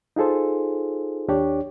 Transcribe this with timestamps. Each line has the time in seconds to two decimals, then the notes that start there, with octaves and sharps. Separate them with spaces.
0.16 D#4 F4 G#4 A4 C5
1.28 D#2 D4 G4 C#5 D5